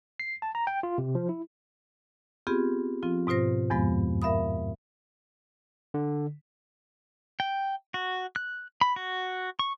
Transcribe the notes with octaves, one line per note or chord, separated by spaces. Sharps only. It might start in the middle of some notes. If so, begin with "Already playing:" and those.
C7
A5
A#5
G5
F4
C3
F3
E4
B3 C4 F4 G4 G#4
F3 C4 F4
G#2 B2 F4 C5 A#6
E2 G2 F3 G#3 B3
A#4 E5 F5 B5 D#6
D3
G5
F#4
F#6
B5
F#4
C#6